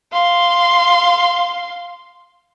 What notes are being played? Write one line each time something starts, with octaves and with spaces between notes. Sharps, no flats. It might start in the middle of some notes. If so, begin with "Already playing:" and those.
F5 C6